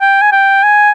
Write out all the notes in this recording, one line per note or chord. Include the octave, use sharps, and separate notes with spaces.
G5
G#5
G5
G#5